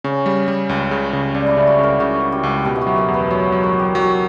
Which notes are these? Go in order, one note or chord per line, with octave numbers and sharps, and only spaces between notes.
C#3 C#4
G3
G3
C#2
C#3
C#3
C#2 D4
D4 E4
C#3
F#4
C#3
A#4
C#3 F#4
C#3
G4
C#2
B2 G4
E4
F#4
F#3
A#4
E2
B4
F#3 C#5
F#3
A#4
F#3
G4
F#3 F#4